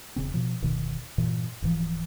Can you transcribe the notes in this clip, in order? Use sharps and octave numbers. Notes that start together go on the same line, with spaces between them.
E1 C#3 C4
B2 F3
F1 D2 B2 D#3
G2 A#2 E3
D1 G#2 E3 F3